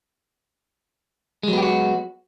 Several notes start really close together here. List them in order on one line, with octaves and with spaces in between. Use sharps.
G#3 F#3 B3 G4 F#4